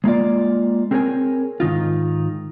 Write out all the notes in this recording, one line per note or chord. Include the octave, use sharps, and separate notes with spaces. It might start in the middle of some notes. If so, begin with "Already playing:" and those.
G#3 A#3 F4 D5
C4 G#4 A#4 C5 C#5 G#5
G#2 D#3 D#4 F4